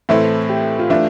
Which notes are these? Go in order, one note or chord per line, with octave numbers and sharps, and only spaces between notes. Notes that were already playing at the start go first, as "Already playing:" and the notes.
A2 E3 A3 C4 E4 A4
G4
F4
E3 A3 D4 E4